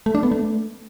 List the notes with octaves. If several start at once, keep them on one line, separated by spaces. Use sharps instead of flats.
A3
D4
B3
A3